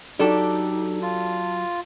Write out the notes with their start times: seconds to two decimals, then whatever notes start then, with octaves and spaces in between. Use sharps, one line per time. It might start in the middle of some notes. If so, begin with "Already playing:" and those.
0.19 F#3 D4 D#4 G4 A4
1.02 F4 A5